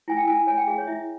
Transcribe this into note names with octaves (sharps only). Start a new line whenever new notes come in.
E4 G#5
G5
E4 G#5
C#5 G#5
G5
G#4 F5
C#5
E4 E5